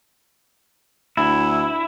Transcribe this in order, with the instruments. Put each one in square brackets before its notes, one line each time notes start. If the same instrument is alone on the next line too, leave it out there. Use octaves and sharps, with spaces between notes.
[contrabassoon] D2 [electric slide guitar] E4